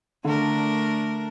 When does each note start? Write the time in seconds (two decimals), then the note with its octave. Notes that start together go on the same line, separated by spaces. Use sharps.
0.25 D3 A3 D4 A#4